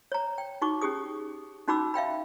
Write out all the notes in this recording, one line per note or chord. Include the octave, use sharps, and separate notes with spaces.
C#5 A#5
G5
D#4 F#4 C#6 D6
C#4 G4 G#4 D#6
C#4 D#4 F#4 B5 D6 E6
E5 F5 G5 B5